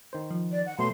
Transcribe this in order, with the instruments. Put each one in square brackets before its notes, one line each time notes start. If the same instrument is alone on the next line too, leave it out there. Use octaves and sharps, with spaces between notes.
[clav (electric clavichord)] D#3 C5
[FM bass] F3
[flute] D5
F#5
[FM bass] B2 [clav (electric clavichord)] F#3 A3 B3 [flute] C6